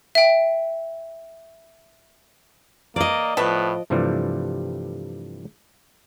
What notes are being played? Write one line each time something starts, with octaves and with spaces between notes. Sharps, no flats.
E5 G5
A#3 D5 D#5
A2 F3 B3 E5 A5
G2 C3 E3 F3 G3 A3